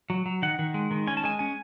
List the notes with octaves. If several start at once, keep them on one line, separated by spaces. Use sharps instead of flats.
F#3
F#3
D#3 F#5
D#3
G#3
D#3
C#4 G#5
A5
G#3 G#5
C#4 G#5